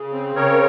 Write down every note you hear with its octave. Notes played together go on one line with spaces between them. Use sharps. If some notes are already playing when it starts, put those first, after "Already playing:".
Already playing: C#3
C4
C#3 A#4 C#5